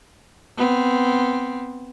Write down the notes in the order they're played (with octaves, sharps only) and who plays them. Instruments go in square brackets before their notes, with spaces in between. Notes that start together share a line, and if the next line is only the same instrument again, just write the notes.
[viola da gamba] B3 C4